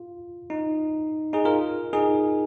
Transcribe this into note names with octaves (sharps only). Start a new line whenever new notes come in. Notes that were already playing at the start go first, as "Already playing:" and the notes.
Already playing: F4
D#4
D#4 G#4
F4 A#4
D#4 G#4